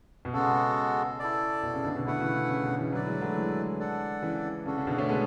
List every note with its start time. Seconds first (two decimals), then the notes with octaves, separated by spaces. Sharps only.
0.25 B2
0.33 C#3 G#3 B3 F#4 A4
1.19 E4 A4 D5
1.63 B2
1.74 C#3
1.84 B2 D3
1.95 B2 D3
2.06 B2 D3 A3 E4 B4 F#5
2.20 C#3 E3
2.35 C#3
2.49 C#3
2.64 B2 D3
2.79 C#3 E3
2.92 D3 F#3 E4 B4 D5
3.07 E3 G#3
3.21 F#3 A3
3.36 E3 G#3
3.79 D4 A4 D5 F#5
4.22 C#3 E3
4.66 C#3 D4 F#4 A4
4.77 C#3
4.87 B2 D3
4.98 A3 C#4
5.09 G#3 B3